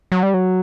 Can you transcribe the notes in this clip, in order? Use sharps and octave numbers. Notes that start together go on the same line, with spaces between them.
F#3
G3
F#3